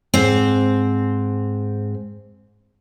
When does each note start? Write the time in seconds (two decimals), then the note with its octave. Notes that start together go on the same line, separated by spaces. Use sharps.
0.14 G#2 C4